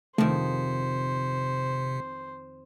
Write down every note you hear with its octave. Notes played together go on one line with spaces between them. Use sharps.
F2 C3 D#3 A3 G#4 C5